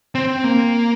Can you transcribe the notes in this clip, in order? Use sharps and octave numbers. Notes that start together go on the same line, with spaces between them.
C4
A#3